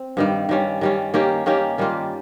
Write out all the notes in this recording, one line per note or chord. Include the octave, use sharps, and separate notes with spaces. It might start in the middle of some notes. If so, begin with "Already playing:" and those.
Already playing: C4
G2 D#3 G3
D#3 G3 C#4
D#3 G3 C#4
D#3 A#3 C#4 G4
D#3 A#3 C#4 G4
D#3 G3 A#3 F4